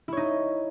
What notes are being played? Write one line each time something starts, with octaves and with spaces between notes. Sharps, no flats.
D#4 E4 C#5